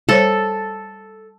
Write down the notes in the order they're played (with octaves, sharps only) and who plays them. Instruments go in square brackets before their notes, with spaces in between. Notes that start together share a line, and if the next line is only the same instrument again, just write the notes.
[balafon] G3 C5 C#5 [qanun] A4